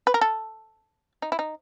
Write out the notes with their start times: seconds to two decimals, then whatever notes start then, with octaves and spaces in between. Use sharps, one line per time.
0.07 B4
0.14 A#4
0.21 A4
1.22 D#4
1.32 E4
1.39 D#4